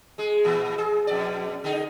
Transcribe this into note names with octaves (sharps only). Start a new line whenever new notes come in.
G#3 G#4
A#2 E3 B3
G#4
F2 B2 D5
D3 D#4 G#4